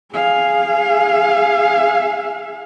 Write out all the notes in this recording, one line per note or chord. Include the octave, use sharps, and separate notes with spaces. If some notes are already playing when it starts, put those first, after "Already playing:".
G#4 F5